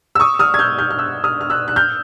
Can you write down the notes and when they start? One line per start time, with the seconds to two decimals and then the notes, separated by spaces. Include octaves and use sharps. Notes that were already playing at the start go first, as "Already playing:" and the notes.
0.15 E6
0.20 C#6 D#6
0.39 D#6 F6
0.54 G#6
0.59 F6 G6
0.78 F6 G6
0.91 F6
0.98 E6 F#6
1.24 D#6 F6
1.41 F6
1.50 E6 F#6
1.68 F#6
1.76 F6 G6